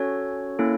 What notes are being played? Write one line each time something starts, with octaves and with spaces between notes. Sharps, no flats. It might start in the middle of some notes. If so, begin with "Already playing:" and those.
Already playing: C#4 F#4 A4 C#5
A#3 C#4 E4 A4